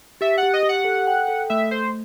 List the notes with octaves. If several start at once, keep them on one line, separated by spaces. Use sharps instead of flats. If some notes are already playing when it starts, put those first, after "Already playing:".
G4 E5
F#5
G4
D#5
G4
F#5
A4
G5
A4
A3 E5
A3 C5